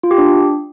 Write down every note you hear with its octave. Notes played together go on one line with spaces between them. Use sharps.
F4
G4
D4